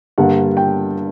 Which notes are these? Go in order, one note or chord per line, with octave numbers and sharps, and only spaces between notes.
G2 D3 G3 A#3 F#5
G5